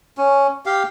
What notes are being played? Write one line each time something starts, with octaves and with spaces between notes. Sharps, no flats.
C#4
G4 F5